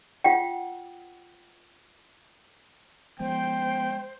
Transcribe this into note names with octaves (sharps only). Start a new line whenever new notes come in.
F4 F#5 G5
F3 G#3 B3 C5 G5